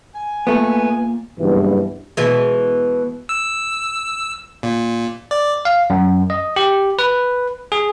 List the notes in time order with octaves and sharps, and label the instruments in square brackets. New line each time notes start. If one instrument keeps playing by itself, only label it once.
[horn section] G#5
[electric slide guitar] A#2 [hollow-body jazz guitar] A3 B3
[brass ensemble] F#1 G2 B2 E3
[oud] B2 E3 G#3
[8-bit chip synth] E6
A#2
D5
[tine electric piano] F5
F#2
D#5
G4
B4
G#4